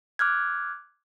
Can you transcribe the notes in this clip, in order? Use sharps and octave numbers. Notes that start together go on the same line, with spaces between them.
D6 F6 F#6 G#6